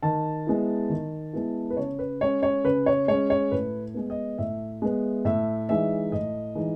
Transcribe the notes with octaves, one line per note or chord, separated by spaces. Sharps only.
D#3 A5
G#3 B3 E4
D#3
G#3 B3 E4
B4
C#3 C#5
B4
G#3 C#4 C#5
C#5
C#3 B4
C#5
G#3 C#4 C#5
C#5
A2 B4
G#3 B3
D#5
A2 E5
G#3 B3
A2 E5
E3 G#3 D#4 E5
A2 D#5
E3 G#3 D#4